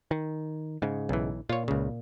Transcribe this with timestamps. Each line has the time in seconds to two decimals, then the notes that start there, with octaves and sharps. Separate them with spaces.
0.11 D#3
0.82 G#2 C#3
1.09 B1 E3
1.49 A#2 F4 C#5
1.68 C#2 C#3